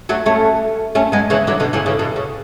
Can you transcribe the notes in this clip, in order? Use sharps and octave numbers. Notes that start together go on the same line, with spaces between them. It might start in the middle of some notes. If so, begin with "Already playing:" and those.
F#3 A3
A3 C#4
A3 C#4
G#3 B3
C#3 E3
D3 F#3
B2 D3
C#3 E3
C#3 E3
B2 D3
C#3